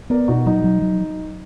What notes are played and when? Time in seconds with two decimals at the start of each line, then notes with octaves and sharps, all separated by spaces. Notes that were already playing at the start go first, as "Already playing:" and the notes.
0.10 B3 A#4 D5
0.28 B2 D#4 F#4
0.46 F#3 D#4
0.64 F#3
0.82 F#3